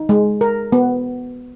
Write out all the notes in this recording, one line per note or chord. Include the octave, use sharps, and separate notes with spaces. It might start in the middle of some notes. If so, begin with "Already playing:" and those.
Already playing: D#4
G#3
A#4
B3